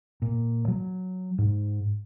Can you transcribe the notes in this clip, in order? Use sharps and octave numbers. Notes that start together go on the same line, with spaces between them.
A#2
F#3
G#2